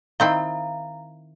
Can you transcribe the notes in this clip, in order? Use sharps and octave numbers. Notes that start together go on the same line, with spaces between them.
D#3 C4 E4 F5 A#5